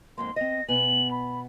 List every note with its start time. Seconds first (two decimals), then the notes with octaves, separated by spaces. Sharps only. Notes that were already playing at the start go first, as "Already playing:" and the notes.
0.18 F2 G#2 A#3 C6
0.36 C4 D#5 A#6
0.68 B2 B3 G#5 F#7
1.11 B5